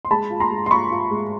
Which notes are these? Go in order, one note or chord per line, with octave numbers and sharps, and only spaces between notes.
C6
G#3 A5 B5
F4
A#5 C6
G#3
C6
F4 B5 C#6
F4
G#3